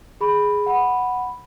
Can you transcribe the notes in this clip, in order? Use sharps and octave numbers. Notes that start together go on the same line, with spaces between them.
G#4 B5
F#5 B5